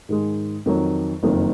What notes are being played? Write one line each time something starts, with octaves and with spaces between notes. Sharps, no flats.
G#2 D#3 G#3
F2 D#3 F#3
F#1 F2 D#3 F#3